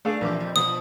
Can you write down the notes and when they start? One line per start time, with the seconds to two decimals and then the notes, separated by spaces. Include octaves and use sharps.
0.05 A3 D4 G#4 F5
0.21 A#1 C3 E3 D6
0.40 F2
0.56 B2 F3 D#6